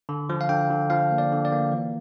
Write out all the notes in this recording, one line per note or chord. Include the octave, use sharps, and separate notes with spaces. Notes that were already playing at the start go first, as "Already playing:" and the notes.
D3
F3
F5
D3 G5
D3
F3 F5
A#3
D5
D3
D5
A#3
E3